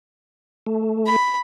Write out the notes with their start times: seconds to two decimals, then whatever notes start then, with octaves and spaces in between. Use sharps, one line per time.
0.66 A3
1.07 B5